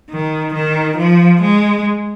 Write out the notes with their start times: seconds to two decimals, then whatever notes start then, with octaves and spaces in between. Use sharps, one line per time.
0.10 D#3
0.54 D#3
0.98 F3
1.42 G#3